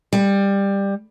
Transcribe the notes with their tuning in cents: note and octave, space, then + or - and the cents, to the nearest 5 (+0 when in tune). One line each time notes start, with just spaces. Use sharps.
G3 +15